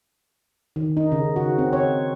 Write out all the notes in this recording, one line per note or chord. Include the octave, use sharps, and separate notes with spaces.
D#3
D#4
C#3
F#4
C4
C#5